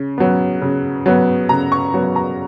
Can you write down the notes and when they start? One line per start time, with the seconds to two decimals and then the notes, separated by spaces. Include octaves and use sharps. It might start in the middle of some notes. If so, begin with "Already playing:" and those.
Already playing: C#3
0.18 F#3 B3
0.61 C#3
1.06 F#3 B3
1.49 C#3 A#5
1.72 C#6
1.94 F#3 B3
2.16 A#5